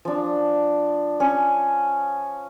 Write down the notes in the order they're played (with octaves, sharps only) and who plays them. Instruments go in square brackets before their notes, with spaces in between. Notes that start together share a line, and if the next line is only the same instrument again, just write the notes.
[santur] F3 D4
C#4